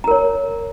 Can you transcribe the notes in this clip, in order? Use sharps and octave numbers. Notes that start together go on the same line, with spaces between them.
A#4 C#5 A#5